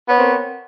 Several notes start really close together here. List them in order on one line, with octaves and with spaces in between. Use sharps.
B3 C#5 C4 A#4